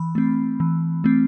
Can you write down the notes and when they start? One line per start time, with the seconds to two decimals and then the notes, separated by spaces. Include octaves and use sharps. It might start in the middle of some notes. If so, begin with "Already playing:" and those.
Already playing: E3 B5
0.15 A3 C4
0.60 E3
1.04 A3 C4